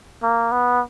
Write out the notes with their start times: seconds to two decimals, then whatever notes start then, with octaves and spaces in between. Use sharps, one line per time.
0.23 A#3
0.52 B3